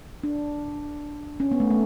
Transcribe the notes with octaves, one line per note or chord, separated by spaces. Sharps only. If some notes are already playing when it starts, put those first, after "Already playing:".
D4
C#4
B3
A3
A3